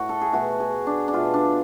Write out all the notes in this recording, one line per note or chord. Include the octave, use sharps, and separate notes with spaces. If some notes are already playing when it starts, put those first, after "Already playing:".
Already playing: A2 F#4
A4
G#4
B2 A3 F#4
G#4
D4
D4
B2 A3 F4
D4